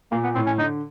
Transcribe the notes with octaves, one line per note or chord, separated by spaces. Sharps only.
A#2 A#3
B3
A2 C4
C#4
D3 D#4